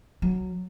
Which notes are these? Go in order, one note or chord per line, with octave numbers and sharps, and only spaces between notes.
F#3